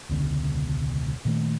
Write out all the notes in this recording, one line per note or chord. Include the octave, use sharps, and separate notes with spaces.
E1 C#2 B2 D3
A#2 D#3 A3